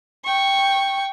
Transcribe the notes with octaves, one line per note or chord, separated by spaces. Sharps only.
G5 C#6